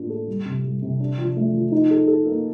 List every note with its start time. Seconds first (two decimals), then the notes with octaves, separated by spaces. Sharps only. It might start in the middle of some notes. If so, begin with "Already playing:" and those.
Already playing: A2 A#3 D4 F4
0.10 A4
0.28 G3
0.46 C3
0.64 G3
0.82 C3
1.00 D4
1.18 F3
1.37 A3
1.54 F3
1.72 D#4
1.91 A4
2.08 A4
2.26 A#3